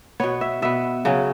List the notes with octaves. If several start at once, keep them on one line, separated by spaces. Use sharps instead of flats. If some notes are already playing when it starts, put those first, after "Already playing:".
B2 B3 C#5
E5
B2 B3 E5
C#3 F#3 C#4